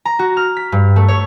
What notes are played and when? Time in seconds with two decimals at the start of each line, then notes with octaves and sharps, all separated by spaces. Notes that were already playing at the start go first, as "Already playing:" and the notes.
0.05 A#5
0.19 F#4
0.37 F6
0.57 B6
0.72 G2
0.96 A3
1.08 C#5